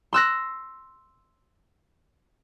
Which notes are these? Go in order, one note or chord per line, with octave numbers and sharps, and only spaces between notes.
C6 E6 F#6 A#6